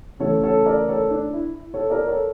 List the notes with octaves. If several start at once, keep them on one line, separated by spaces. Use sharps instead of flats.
C#3 E3 A3 A4 C#5
A4 C#5
A#4 D5
A4 C#5
D4
E4
A4 C#5
A#4 D5
A4 C#5